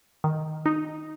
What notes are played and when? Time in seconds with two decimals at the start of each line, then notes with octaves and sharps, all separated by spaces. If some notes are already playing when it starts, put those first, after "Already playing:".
0.24 D#3
0.66 D#4